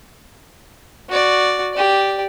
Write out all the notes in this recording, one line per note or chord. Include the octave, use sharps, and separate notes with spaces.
F#4 D5
G4 D5